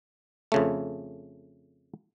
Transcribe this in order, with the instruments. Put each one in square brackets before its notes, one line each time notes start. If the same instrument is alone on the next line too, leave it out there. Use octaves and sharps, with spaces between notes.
[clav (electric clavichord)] F2 C#3 A3